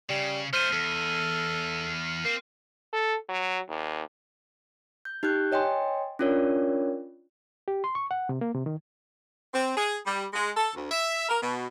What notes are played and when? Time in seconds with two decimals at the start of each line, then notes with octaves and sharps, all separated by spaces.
0.10 C#3 G3
0.53 A3 C4 C5 F6 D#7
0.73 E2 A4
2.25 A#3 C4
2.93 A4
3.29 F#3
3.69 D#2
5.05 G6
5.23 D#4 G4 F#6 G6
5.52 C#5 D#5 G5 G#5 C6
6.19 C#4 D4 F4 A#4 C#5 D5
7.68 G4
7.84 C6
7.95 C#6
8.11 F#5
8.29 C3
8.41 A#3
8.54 C3
8.66 D#3
9.54 C4
9.77 G#4
10.06 G3
10.33 G#3
10.57 A4
10.76 D2
10.91 E5
11.29 A#4
11.42 B2